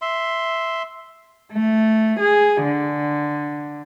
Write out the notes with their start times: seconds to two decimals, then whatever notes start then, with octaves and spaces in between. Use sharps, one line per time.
0.02 E5 C6
1.53 A3
2.19 G#4
2.63 D3